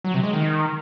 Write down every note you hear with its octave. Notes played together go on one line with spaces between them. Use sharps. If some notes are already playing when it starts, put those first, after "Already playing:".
F#3
C3
G#3
D#3